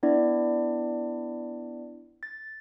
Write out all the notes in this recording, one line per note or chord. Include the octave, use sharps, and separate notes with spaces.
B3 D4 E4 D5
A6